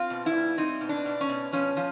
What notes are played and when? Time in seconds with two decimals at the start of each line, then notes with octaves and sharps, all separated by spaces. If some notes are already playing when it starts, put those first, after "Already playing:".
Already playing: C4 F4
0.10 B2
0.26 E4
0.34 G3
0.57 C4 D#4
0.81 B2
0.89 D4
1.05 B2
1.21 C#4
1.29 B2
1.52 F3 C#4
1.77 F3